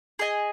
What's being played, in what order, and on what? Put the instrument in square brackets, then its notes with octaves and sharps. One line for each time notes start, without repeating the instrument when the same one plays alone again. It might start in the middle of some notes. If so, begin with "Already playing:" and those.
[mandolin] G#4 D#5 G#5